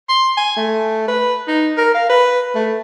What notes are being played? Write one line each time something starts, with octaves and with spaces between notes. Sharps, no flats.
C6
G#5
A3
B4
D#4
A#4
F5
B4
A3